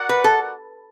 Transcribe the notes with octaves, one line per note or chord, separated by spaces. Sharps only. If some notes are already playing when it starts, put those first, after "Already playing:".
Already playing: F#4 A#4 D5 F#5
B4
A4